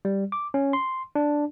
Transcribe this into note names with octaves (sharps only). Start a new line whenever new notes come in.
G3
D6
C#4
C6
D4